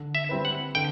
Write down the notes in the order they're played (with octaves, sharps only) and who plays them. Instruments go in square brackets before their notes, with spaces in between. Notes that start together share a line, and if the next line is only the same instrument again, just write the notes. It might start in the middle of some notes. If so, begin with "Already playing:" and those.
Already playing: [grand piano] D3
[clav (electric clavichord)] E5
[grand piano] G3 C4 E4 B4
[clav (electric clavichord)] F#5
[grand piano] D3 [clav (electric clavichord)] G5